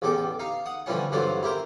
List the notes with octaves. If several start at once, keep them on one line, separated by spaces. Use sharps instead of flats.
A1 E2 G4 A4 D6
D#4 F5
F#5 D#6
D3 E3 F3 G3 C#4 F#5
G2 D3 E3 F#3 C4 F4
E4 G4 A#4 C5